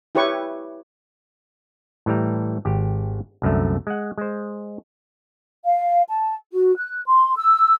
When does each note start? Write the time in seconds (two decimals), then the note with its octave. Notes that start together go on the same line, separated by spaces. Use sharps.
0.15 E4 G4 B4 C#5 C#6
2.06 A2 E3 G3 A#5
2.65 G#1 G4
3.42 C2 F#2 D3 A3
3.87 G#3 F#5
4.18 G#3 C5
5.64 F5
6.09 A5
6.53 F#4
6.77 F#6
7.06 C6
7.35 E6